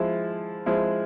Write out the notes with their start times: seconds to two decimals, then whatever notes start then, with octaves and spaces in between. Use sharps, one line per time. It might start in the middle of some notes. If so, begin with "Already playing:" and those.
Already playing: F3 G#3 E4
0.66 F3 G#3 E4